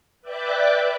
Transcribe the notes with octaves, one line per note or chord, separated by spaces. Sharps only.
B4 D5 E5 G5 D6 F#6